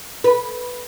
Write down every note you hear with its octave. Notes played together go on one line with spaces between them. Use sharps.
B4